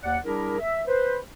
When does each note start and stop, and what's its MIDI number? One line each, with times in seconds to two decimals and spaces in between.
0.03 0.17 39
0.03 0.17 74
0.03 0.17 78
0.24 0.56 55
0.24 0.56 62
0.24 0.56 64
0.24 0.56 68
0.24 0.56 70
0.60 0.81 76
0.87 1.18 71
0.87 1.18 72